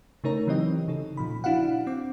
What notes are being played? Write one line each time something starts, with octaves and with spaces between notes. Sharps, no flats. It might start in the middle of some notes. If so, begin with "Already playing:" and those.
C#3 A3 D#4 A#4 C#5 A#5
E3 F#3 C4 G4 D#5
C#3 D#4 A4
A#2 F3 B5
D4 E4 F#4 F5 F#5
C4 D6